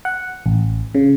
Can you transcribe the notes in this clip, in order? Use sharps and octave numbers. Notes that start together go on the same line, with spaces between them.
F#5
A1
C#3